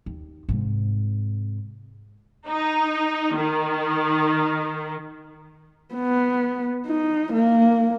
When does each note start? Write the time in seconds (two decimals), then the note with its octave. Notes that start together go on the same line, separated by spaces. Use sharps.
0.06 D#2
0.49 G#2 C3
2.47 D#4
3.35 D#3
5.94 B3
6.87 D#4
7.32 A#3